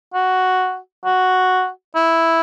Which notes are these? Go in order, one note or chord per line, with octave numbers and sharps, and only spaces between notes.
F#4
F#4
E4